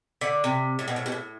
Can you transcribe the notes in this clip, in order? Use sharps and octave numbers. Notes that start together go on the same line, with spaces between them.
D3
C3
A2
B2
A2
B2
A2